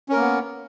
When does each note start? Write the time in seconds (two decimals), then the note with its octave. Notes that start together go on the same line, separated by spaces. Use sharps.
0.09 C#4
0.13 A#4
0.16 A#3
0.20 B3